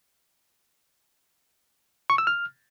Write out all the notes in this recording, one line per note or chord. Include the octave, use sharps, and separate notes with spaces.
C#6
E6
F6